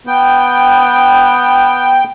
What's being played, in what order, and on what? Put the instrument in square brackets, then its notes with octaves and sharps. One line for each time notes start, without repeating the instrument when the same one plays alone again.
[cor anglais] B3 [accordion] G5